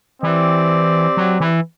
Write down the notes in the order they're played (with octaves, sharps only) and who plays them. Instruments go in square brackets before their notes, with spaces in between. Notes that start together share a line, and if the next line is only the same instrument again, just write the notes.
[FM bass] E3 [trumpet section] C4 G4 D5
[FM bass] F#3
E3